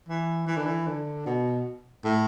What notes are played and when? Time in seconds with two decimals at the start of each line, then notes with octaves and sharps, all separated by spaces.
0.09 E3
0.47 E3
0.57 D3
0.66 E3
0.87 D3
1.26 B2
2.04 A2